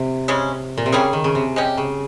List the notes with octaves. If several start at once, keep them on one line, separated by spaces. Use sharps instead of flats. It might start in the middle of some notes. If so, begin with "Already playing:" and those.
Already playing: C3
C#3 G#3 C#4
A#2
C3
C#3 G3 A#3 C#4 G#4
D#3
C#3
C3
G#3 C#4 G4
C#3